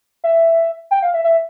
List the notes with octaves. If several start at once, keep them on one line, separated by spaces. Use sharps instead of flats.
E5
G5
F5
E5
E5